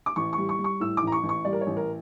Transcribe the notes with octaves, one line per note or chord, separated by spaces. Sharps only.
D6
A1 C#6
G3 C#6
C#6
G3
C#6
A2 E6
D6
A1 A#5
C#6
A1
C#6
G3 D5
A#4
C#5
A1
A#4